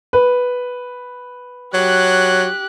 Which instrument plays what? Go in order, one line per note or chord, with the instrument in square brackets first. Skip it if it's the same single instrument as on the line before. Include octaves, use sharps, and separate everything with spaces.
[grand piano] B4
[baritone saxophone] F#3 [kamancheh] G4 F#6